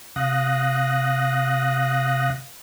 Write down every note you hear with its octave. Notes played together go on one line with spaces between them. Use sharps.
C3 F5 D#6 F#6 A#6